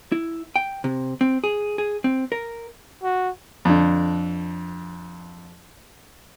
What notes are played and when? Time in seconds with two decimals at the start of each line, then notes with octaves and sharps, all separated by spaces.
0.12 E4
0.56 G5
0.84 C3
1.21 C4
1.44 G#4
1.78 G#4
2.04 C4
2.32 A#4
3.03 F#4
3.65 F2 D3